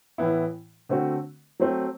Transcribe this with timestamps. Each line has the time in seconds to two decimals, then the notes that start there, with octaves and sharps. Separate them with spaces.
0.18 A2 E3 B3 E4
0.89 D3 A3 C4 F#4
1.60 F#3 A3 C4